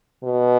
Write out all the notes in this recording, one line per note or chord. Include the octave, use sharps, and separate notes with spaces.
B2